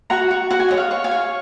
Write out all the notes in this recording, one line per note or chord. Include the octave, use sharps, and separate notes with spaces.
F#4 F#5 A#5
F#4
F#4 F#5
G#5
C#5 D#5 F#5
F5
C#5
F5 G#5
C#5